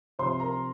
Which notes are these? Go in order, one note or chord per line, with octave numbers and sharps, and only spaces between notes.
C3 F3 C5 C6
A#4 A#5